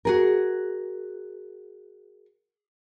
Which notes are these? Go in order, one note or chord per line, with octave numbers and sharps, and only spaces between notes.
F#4 G#4 A#4